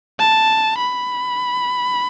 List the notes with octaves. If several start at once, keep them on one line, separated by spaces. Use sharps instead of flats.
A5
B5